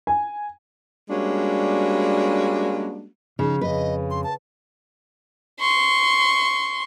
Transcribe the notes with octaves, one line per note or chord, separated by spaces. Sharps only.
G#5
G3 G#3 A#3 C#4 D4 F#4
C#3 F3 D#4
F2 C#3 B4 D#5
C6
A5
C6 C#6